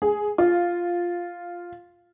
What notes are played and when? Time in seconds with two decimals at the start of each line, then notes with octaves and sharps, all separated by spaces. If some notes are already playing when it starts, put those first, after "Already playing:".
0.02 G#4
0.38 F4